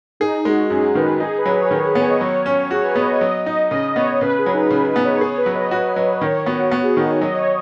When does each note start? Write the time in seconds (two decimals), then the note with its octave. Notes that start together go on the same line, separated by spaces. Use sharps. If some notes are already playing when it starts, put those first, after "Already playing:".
0.20 D#4 G#4
0.45 G#3 F#4
0.70 F#2 G#4
0.95 D#3 B4
1.20 D#4 G#4
1.38 B4
1.46 F#3
1.54 C#5
1.71 D#3 C#5
1.84 B4
1.95 B3 C#5
2.10 D#5
2.20 F#3 C#5
2.45 C#4 C#5
2.71 F#4 G#4
2.78 C#5
2.83 B4
2.95 B3 D#5
3.09 C#5
3.21 F#3 D#5
3.46 D#4 D#5
3.71 C#3 D#5
3.96 B3 C#5
4.21 C#3 B4
4.38 G#4
4.46 F#3
4.54 D#4
4.70 C#3 G#4
4.88 B4
4.96 B3
5.04 C#5
5.21 G#4 C#5
5.37 B4
5.46 F#3
5.55 D#5
5.71 F#4
5.96 F#3
6.21 D#3 C#5
6.46 B3 F#4
6.71 B3 F#4
6.84 G#4
6.97 D#3 D#4
7.09 D#4
7.21 F#3 D#5
7.34 C#5